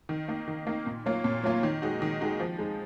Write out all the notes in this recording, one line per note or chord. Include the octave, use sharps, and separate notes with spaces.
D#3
A#3 D#4
D#3
A#3 D#4
A#2
F#3 A#3 F4
A#2
F#3 A#3 F4
D#3
G#3 D#4 F#4
D#3
G#3 D#4 F#4
F3
G#3 D#4